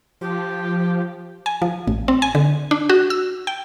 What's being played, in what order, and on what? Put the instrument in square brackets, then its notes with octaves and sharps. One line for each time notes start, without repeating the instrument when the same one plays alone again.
[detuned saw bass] F3 [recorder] G4
[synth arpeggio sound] G#5
F3
A1
C4
G#5
D3
D4
F#4
E6
G5